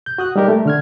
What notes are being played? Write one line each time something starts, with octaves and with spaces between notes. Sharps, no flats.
G6
F#4 D#6 F#6
G3 D#4 G4 A#4
A3
D3 F6 G#6